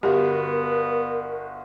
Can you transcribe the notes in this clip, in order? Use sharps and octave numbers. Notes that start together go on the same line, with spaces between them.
G1 B3 F#4 G4 A#4 E5